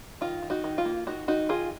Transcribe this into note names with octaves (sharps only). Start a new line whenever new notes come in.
D#3 F4
D#3
D#4 F#4
D#3
F4
A#3
D#3 D#4 F#4
D#3 D#4 F#4
D#3 F4 G#4